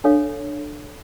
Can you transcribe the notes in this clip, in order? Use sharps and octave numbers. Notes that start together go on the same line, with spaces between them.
D4 A4 C#5 F5